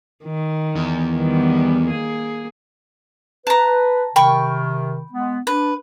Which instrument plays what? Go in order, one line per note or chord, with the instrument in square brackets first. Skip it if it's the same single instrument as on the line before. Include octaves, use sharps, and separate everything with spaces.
[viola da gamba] D#3
[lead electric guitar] E2
[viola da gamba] D#3 G3 B3
A#3 G#4
[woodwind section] B4 [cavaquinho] A5 A#5
[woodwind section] C3 D#3 [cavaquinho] G5 B5 C#6
[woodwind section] G#3 B3
[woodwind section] D4 [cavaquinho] B4